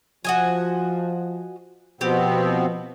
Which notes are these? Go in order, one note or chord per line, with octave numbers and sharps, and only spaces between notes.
F3 F#4 D#5 G#5
B2 F3 B3 C4 G4